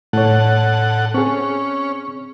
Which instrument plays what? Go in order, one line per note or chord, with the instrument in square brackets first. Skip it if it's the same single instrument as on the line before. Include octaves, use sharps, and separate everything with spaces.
[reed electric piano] A2 C#5 [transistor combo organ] A4 F#5
[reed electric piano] C4 G#4 [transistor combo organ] C#4